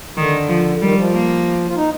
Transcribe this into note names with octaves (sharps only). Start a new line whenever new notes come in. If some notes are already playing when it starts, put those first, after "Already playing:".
D3 D#3
F3
D#3 G3
F3
A#3
F4
D#4